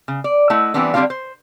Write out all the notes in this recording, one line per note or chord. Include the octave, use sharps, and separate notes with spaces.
C#3
D5
A3 E4 D#5 F#5
E3 G3 B3 C4 D4
D3 G3 C4 D4 F4 F5
C5